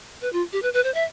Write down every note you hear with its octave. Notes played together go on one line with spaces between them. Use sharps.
B4
F4
G4
B4
B4
C5
E5